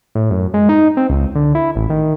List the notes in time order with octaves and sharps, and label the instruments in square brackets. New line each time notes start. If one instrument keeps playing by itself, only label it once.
[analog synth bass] A2
F#2
G#3
D#4
C4
C#2
D3
E4
A1
D#3